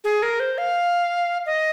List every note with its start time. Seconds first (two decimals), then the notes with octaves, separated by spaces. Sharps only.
0.04 G#4
0.23 A#4
0.40 C5
0.58 F5
1.46 D#5